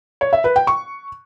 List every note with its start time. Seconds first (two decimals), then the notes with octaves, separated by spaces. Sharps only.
0.21 C#5
0.33 E5
0.44 B4
0.56 G5
0.67 C#6